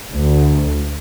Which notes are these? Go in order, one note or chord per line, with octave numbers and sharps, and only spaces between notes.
D2